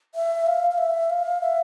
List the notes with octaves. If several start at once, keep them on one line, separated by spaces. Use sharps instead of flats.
E5
F5
F5
E5
F5
E5